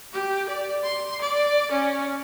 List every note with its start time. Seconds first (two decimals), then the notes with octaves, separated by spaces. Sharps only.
0.13 G4
0.49 D5
0.84 C6
1.21 D5
1.71 C#4